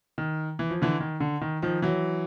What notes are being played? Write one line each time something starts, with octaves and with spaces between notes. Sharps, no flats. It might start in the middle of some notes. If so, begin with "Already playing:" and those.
D#3
E3
F3
D3 E3
D#3
D3
D#3
D#3 F3
E3 F#3